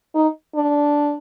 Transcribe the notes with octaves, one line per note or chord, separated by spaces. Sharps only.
D#4
D4